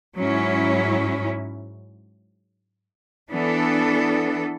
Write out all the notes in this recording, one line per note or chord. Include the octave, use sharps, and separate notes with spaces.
G#2 F#3 C#4 E4
E3 B3 D4 A4